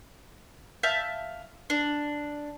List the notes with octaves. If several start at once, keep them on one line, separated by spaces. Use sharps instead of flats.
E5 F5 A5 G6
D4